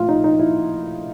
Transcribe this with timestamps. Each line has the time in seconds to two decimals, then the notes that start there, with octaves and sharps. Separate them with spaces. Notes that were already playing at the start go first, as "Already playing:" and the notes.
Already playing: A#1 A2 F3 F4
0.09 D#4
0.24 D#4
0.39 E4